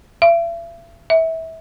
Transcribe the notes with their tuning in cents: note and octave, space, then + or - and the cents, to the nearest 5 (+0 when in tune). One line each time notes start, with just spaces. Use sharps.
E5 +40
E5 -25